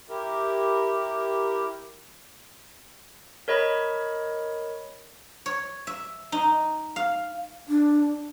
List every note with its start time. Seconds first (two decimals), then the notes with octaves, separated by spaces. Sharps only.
0.09 E4 G4 A#4
3.48 A#4 C#5 D#5 B5
5.46 C#5
5.87 E5
6.32 D#4
6.96 F5
7.68 D4